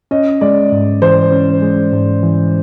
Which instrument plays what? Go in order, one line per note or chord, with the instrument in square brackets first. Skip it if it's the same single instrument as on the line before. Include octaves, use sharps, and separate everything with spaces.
[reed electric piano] C#4 [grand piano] D#5
[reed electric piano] G#3 [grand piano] D5
[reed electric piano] G#2
[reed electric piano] E3 [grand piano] C5
[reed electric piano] C#4
G#3
G#2
E3